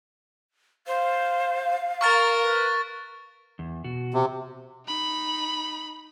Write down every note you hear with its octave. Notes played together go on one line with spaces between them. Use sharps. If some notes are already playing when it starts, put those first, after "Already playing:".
C5 F5
A#4 A#5 C#6 F6 A6
B4
E2
B2 F#4
C3
D#4 B5